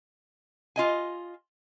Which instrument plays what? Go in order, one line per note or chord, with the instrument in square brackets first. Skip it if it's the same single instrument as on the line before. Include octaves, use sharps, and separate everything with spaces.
[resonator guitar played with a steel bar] F4 D#5 G#5